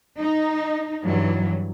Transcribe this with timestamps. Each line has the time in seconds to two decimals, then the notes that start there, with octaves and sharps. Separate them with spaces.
0.19 D#4
1.05 G2 E3 F#3